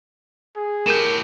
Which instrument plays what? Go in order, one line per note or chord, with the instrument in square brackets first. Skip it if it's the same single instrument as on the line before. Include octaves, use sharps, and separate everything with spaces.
[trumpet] G#4
[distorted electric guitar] A2 G4 [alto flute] A#4 [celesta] G6 D#7 E7